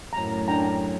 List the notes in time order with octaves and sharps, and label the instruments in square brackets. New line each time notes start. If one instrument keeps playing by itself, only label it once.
[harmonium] F#2 A2 F#3 [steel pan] A#5
[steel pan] D4 G5 A#5